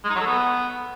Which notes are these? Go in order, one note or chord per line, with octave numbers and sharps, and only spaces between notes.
G#3
D#4
F#3
A4
B3